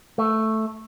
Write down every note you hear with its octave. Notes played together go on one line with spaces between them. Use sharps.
A3